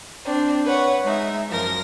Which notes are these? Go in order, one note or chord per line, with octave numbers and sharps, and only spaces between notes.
C4 D4
B4 C#5 F#5
G#3 D#4 E5
F#2 F3 A#4 A#6